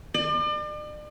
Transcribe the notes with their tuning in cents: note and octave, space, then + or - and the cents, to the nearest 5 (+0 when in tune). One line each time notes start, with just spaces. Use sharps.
D5 +40